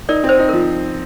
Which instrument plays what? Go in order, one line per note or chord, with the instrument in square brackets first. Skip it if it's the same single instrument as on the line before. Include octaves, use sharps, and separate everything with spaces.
[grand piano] D#4 [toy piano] A#4 D5
[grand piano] C4
[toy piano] C5
[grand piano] D#4
[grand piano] F3 [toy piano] A#4